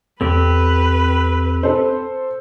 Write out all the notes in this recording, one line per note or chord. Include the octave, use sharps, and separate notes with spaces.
E2 C4 G4 A4 B4
A4 C5